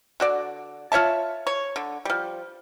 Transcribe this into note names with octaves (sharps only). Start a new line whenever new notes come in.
D3 F#4 D5
F4 C#5 E5 A5
C#5
D3
F3 G3